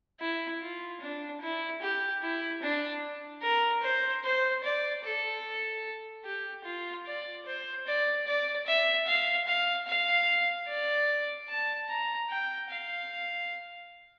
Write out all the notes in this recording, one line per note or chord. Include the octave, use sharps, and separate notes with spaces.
E4
F4
D4
E4
G4
E4
D4
A#4
C5
C5
D5
A4
G4
F4
D5
C5
D5
D5
E5
F5
F5
F5
D5
A5
A#5
G5
F5